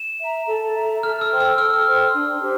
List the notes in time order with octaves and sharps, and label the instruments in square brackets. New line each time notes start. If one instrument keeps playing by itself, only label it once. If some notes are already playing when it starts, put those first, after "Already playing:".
Already playing: [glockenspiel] E7
[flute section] E5 A#5
A4
E5 A#5
[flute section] A4 [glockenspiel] F6
[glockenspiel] E6
[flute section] C5 G5 C6
[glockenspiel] E6
[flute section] A4 [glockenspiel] F6
[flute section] C5 G5 C6
D4
G4 C5